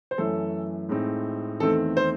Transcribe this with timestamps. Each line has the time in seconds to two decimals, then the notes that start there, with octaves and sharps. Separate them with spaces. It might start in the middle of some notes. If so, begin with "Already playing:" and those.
0.11 C5
0.18 F#2 E3 A3 C#4 A4
0.89 A2 G#3 C4 D#4
1.60 E2 D#3 A3 C4 D#4 A4
1.97 C5